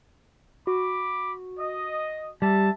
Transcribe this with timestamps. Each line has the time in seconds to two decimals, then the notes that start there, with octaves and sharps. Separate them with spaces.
0.67 F#4 B5 D6
1.59 D#5
2.42 G3 G4 E5 A5